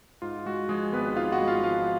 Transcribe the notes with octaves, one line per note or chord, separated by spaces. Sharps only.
G#2 F4
G#3 F#4
F3 G#3 G#4
G#1 B3 B4
G#2 F4 F5
F#4 F#5
G#3
F4 F5
F3 F4 F5